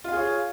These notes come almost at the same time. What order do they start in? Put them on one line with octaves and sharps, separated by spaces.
F4 F5 G#4 C#5